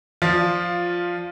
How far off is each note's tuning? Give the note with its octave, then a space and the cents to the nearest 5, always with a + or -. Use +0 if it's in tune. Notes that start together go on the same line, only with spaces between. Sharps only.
F3 +5 F4 +0 D5 -5